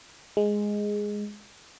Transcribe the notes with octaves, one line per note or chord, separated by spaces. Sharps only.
G#3